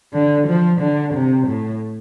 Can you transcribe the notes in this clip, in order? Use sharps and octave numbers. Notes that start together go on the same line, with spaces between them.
D3
F3
D3
C3
A2